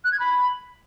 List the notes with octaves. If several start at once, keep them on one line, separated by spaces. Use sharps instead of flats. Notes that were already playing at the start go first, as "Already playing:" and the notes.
F#6
G#6
B5